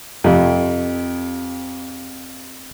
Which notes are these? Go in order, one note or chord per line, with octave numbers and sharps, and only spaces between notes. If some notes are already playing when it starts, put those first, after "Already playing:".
F2 C3